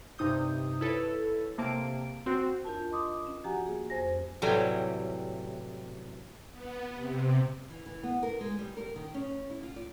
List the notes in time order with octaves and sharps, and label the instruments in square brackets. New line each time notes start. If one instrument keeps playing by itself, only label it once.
[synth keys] G2 C3 D#4 D#6 G6
E4 A4 B4 C#5
C3 A#3 A5 D7
C4 F#4 C5
[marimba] E2 D4 F4 A#4 A5
D#5 C6 D6 D#6
C#4
F3 F#4 G4 F#5 G#5 A#5
A#3 G#4
F2 C5 G#5 A#6
[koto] A2 C3 E3 F#3 G3
[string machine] B3
C3
[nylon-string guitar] E3
E3
B3
A#4
G#3
G3
A#4
D#3
C#4
E4
F4
D5